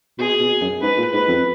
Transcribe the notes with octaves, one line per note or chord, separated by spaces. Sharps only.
B2 G#4
B2
F#2
G#2 B4
A#2
G#2 B4
F2